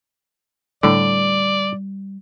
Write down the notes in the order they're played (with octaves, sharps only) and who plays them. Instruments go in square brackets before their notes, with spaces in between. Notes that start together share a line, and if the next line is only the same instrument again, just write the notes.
[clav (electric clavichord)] A2 D3 [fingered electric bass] G3 [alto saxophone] D5